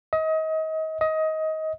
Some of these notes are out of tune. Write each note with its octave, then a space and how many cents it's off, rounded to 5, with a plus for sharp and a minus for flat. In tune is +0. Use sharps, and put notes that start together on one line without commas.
D#5 +30
D#5 +20